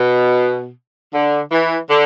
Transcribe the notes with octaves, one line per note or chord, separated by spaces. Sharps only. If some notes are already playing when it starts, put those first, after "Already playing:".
Already playing: B2
D3
E3
D3